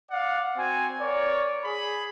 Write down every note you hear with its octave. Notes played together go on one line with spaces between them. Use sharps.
D5 F5 F#5
C4 F#4 G#5
A#4 C#5 D5
G#4 B5